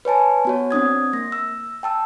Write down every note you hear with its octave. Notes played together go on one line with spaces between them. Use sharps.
B4 C#5 G#5 A5
B3 F#4 C#5
C4 D4 D#6 G#6
A#3 A#6
E6
G5 A5 E6